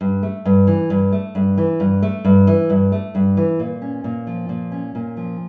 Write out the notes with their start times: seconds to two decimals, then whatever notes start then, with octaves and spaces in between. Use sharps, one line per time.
0.01 G2
0.23 A3
0.45 G2
0.67 E3
0.90 G2
1.12 A3
1.35 G2
1.58 E3
1.80 G2
2.02 A3
2.24 G2
2.47 E3
2.70 G2
2.92 A3
3.15 G2
3.37 E3
3.59 A#2
3.82 C#4
4.04 A#2
4.27 F3
4.49 A#2
4.72 C#4
4.95 A#2
5.17 F3